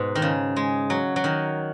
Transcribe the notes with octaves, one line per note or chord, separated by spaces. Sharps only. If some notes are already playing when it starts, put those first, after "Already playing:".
Already playing: G#2 B2
D#3
C#3
G#3
F#3
F#3
D#3